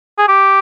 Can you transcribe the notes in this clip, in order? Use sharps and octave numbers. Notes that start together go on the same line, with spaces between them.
G#4
G4